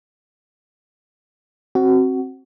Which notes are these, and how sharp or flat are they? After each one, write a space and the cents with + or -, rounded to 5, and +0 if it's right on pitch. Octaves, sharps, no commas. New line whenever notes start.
C4 +20 F#4 +15